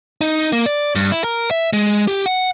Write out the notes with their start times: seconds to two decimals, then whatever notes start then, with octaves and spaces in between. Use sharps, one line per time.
0.21 D#4
0.52 A#3
0.66 D5
0.95 G2
1.12 E4
1.24 A#4
1.51 E5
1.73 G#3
2.07 G4
2.26 F#5